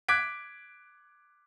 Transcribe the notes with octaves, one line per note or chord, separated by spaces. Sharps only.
D6 F#6 G#6 B6 D7